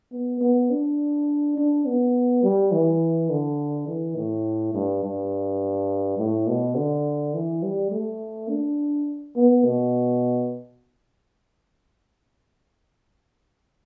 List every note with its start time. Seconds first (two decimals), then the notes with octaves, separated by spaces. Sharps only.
0.12 B3
0.41 B3
0.71 D4
1.58 D4
1.86 B3
2.43 G3
2.72 E3
3.30 D3
3.87 E3
4.17 A2
4.74 G2
5.04 G2
6.19 A2
6.48 B2
6.77 D3
7.34 E3
7.63 G3
7.91 A3
8.49 D4
9.36 B3
9.65 B2